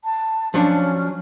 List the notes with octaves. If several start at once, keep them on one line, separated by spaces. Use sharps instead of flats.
A5
F3 F#3 C#4 D4